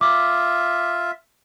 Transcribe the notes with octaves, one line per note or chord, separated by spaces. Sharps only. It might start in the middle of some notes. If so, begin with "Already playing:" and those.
F4 E5 D6